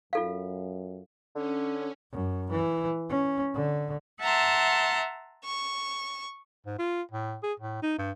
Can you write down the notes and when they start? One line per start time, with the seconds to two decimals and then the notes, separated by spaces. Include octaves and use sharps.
0.13 F#2 F4 A4 F5
1.35 D3 C#4
2.12 F#2
2.51 E3
3.09 C#4
3.54 D3
4.20 E5 F#5 A5 A#5 C6
5.44 C#6
6.66 G#2
6.79 F4
7.11 A2
7.43 G#4
7.59 A2
7.82 D#4
7.98 G2